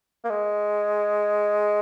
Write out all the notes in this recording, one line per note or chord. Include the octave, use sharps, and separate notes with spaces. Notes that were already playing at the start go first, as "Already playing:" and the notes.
A#3
G#3